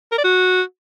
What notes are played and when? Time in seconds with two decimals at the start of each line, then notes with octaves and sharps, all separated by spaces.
0.12 A#4
0.18 D5
0.24 F#4